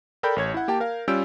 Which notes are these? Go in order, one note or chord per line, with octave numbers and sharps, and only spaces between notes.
A4 A#4 D5 G5 B5 G6
A1 C#5 G#6
E4 F#5
A#3 G4 G5 A5
A#4 F5
G3 C#4 F4 E6 G6 D7